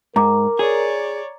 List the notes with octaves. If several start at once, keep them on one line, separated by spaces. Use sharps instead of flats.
G#2 A#4 A#5 D6
G#4 C#5 D5